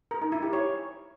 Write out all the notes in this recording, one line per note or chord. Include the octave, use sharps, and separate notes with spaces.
A#4
D#4
E4
G4
C#5